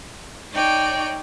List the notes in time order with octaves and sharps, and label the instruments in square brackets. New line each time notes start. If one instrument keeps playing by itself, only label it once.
[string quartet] D#4 C#5 D5 G5